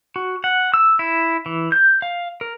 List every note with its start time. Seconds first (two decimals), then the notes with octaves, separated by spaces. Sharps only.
0.16 F#4
0.44 F#5
0.74 E6
0.99 E4
1.46 E3
1.72 G6
2.02 F5
2.41 A#4